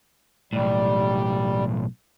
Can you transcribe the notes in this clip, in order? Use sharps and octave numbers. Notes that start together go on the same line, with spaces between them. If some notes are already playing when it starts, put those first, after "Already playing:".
B1 A2 G3